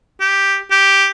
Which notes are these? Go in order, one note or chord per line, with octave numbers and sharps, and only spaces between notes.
G4
G4